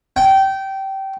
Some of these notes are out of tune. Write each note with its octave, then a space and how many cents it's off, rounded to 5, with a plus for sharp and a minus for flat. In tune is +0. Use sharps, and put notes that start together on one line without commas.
G5 -20